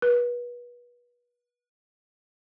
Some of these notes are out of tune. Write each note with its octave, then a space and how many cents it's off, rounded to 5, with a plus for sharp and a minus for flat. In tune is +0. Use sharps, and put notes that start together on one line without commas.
B4 -30